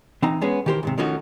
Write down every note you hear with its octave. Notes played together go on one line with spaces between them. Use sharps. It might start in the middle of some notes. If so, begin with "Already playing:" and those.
E3 C4 D#4 A#5
G#3 B3 C#4 G#4
D#3 E3 G4 A#4 C5
D#2 G#2 C3
D#3 F3 A3 C#4 D#4 F#4